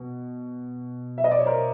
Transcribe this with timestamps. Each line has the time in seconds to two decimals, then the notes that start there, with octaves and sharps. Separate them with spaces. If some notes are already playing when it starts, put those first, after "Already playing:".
Already playing: B2
1.18 E5
1.24 D#5
1.31 D5
1.39 C#5
1.45 A#4 C5